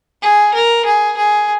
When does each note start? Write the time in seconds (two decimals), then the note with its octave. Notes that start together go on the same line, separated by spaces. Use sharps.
0.22 G#4
0.54 A#4
0.86 G#4
1.17 G#4